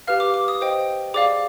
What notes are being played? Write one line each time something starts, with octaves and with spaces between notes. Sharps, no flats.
G4 B4 F5 F6
D6
D6
D#6
C5 D#5 G5
G#4 D5 F5 D6